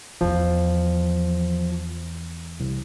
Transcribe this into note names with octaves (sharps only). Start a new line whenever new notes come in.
E2 F3
C2